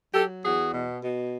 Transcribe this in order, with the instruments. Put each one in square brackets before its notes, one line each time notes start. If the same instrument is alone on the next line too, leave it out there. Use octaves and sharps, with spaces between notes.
[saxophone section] F#3 G4 A4
E2 F#4 G#4
B2
B2